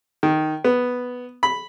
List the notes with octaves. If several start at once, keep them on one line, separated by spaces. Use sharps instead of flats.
D#3
B3
B5